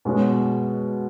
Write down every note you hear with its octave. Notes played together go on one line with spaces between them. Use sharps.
B2 G#3 C#4 F#4